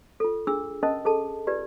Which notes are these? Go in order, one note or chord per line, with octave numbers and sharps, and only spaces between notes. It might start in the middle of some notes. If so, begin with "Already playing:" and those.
F4 A4
D4 G#4 E6
C#4 A#4 D#5 A5 D#6
G#4 A4 A5
F4 G4 B4 D5